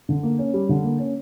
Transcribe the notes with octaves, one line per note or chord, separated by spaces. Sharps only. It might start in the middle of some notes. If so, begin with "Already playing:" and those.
D3
A#3
C#4
G3
D3
A#3
C#4